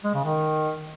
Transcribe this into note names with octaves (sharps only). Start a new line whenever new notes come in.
G#3
C#3
D#3